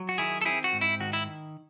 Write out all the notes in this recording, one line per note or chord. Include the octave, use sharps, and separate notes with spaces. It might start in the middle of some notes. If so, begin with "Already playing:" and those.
Already playing: F#3
F#4
D#3 E4 G#4
A4
C4 E4 G#4
F#4
G#2
E4
D#3 F#4
E4